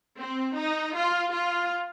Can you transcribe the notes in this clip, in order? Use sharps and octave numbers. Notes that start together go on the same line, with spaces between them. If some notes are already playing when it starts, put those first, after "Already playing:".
C4
D#4
F4
F4